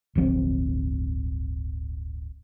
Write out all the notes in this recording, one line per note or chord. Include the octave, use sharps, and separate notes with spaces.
D1 G1 F3 C4